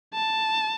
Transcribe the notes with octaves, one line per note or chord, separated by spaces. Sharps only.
A5